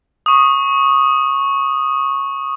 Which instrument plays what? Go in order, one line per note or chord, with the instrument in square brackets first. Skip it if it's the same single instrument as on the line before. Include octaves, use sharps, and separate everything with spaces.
[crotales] C#6 D#6